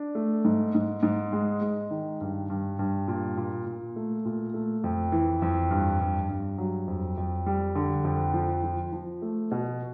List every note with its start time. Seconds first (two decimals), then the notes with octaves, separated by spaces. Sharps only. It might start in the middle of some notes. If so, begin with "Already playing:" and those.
Already playing: D4
0.15 A3
0.45 G#2
0.75 G#2
1.03 G#2
1.32 G#3
1.61 G#3
1.90 D#3
2.21 G2
2.50 G2
2.79 G2
3.08 A#2
3.37 A#2
3.66 A#2
3.96 A3
4.25 A#2
4.54 A3
4.84 F2
5.12 E3
5.42 F2
5.70 G2
6.00 G2
6.29 G2
6.58 F#3
6.88 F2
7.17 F2
7.46 G3
7.75 D3
8.04 F2
8.34 F3
8.63 F3
8.93 F3
9.22 A3
9.51 B2